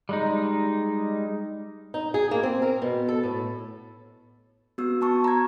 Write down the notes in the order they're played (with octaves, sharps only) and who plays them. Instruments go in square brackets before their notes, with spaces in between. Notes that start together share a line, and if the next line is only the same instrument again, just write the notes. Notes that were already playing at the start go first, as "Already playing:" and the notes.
[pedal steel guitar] G3 G#3 D#4
[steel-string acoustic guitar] D#4
G#4
A#3
C4
A#4
B2
A4
A2
[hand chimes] B3 F#4 E6
B3 A5 C#6
A#5 G#6